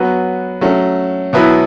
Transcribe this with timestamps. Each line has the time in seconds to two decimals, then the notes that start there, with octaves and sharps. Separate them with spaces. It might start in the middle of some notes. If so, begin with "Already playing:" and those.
Already playing: F#3 B3 F#4 B4
0.61 F#3 A3 C#4
1.33 B2 F#3 B3 E4 B4